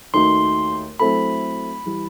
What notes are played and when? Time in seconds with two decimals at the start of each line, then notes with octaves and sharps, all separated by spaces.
0.14 D#2 D#3 A3 D#4 F#4 C6
1.00 F#3 A3 C4 E4 A4 B5
1.86 E3 G3